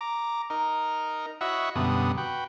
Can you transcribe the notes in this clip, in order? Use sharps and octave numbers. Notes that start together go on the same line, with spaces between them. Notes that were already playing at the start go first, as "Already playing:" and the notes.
A#5 D6
D#4 A#4
E4 F#4 C#5 D#5 E5 F#5
F#2 B2 D3 G3 B3 D#6
F#4 B4 G5